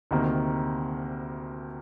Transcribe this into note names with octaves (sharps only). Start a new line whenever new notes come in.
D2 C3 D#3 A#3